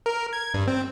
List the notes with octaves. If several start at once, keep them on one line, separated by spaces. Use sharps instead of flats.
A#4
G#6
G2
C4